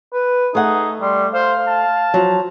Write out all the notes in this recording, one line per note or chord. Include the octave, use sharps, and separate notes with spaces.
B4
A3 D#4 G#4 F#5
G3 C6
C5 F5
A5
F3 F#3